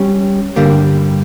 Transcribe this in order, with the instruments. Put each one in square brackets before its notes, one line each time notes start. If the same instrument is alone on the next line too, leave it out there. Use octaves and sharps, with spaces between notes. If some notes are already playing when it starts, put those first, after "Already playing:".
Already playing: [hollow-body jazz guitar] G3 C#4 G4
G2 D3 G3 A#3